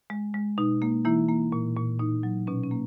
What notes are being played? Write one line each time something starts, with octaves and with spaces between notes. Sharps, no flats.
G#3
G#3
B2 D#4
A#3
E3 A#3 E4
A#3
A#2
A#2
A#2 D#4
F#3
B2 C#4
C#4
A#3